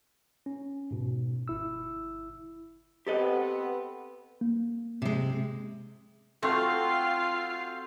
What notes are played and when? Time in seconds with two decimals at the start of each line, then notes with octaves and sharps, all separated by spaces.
0.46 C#4
0.91 G#2 B2
1.48 G1 E4 E6
3.07 B3 C4 G4 A4 B4 D#5
4.41 A#3
5.02 C3 G#3
6.43 A3 C4 F4 F#4 A4 F5